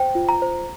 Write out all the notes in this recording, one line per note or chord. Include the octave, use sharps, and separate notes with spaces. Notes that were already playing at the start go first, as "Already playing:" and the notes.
Already playing: C5 G5
F4
A#5
C5